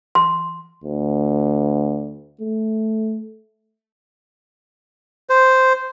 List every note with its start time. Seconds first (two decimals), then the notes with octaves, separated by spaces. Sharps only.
0.15 C6
0.84 D2
2.41 A3
5.30 C5